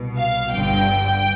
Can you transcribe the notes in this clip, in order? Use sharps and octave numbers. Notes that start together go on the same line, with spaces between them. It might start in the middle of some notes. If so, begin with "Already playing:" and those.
Already playing: C2 B2
F5
G1 G2 D3 G5